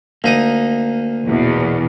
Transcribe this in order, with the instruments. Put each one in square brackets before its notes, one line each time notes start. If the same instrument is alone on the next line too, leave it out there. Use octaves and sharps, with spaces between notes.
[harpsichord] D2 D#4 D#6 [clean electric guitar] A#3
[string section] A#1 E2 B2